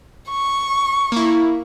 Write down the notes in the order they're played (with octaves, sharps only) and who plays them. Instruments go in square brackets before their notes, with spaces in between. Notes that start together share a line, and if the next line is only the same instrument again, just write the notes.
[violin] C#6
[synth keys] A#3 E4